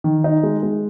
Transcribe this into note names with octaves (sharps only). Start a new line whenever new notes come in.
D#3
D#4
G#3
G#3